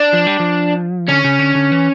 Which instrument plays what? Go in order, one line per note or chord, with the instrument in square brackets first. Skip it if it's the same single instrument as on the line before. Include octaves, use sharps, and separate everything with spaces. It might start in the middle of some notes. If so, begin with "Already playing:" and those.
Already playing: [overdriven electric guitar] D4
[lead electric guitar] F3
G3
F3
[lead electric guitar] D3 [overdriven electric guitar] C#4
[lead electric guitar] C#3
D3
D3
E3